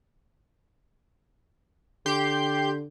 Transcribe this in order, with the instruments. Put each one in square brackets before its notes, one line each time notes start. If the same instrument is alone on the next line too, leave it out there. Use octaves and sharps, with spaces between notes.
[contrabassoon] D3 [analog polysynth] G4 C6 G6